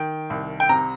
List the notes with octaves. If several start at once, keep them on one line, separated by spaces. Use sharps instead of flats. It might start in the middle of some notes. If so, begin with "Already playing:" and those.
Already playing: D#3 G5
C2
G5
C3 A#5